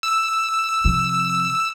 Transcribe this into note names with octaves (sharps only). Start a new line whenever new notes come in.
E6
C3 F3